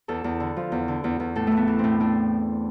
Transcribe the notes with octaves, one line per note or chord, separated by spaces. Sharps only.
E2 A4
E2
D3
F3
E2
D3
E2
E2
A2 A4
E3 A3
B3
E3
A2 C4
A2 D4